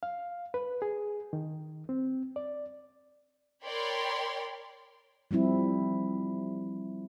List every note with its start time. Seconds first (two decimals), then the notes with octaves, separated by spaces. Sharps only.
0.03 F5
0.54 B4
0.82 G#4
1.33 D#3
1.89 C4
2.36 D5
3.64 A#4 C#5 D5 G5 B5 C6
5.31 F3 G3 C4 E4